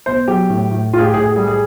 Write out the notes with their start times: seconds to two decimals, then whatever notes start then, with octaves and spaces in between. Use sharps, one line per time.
0.06 B2 C5
0.28 F#3 G4
0.50 A2
0.71 A2
0.93 A2 F4
0.99 G#4
1.04 G4
1.14 A2 G#4
1.26 G#4
1.36 G3 G#4
1.48 G#4